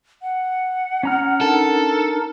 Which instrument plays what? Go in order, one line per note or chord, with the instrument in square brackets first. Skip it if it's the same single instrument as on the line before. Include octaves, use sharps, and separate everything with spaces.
[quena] F#5
[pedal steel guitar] C#4 A#5 F6
[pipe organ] D4 D#4 A#4 [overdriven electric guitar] A4